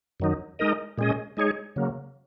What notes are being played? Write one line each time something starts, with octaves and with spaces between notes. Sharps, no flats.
F#2 D#3 F#3 D#4
G#3 D#4 A#4 D#5
A#2 G#3 C#4 G#4 D#5
G#3 D#4 G#4 C#5
C#3 F#3 A#3